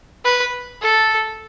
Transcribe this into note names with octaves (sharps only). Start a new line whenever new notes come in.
B4
A4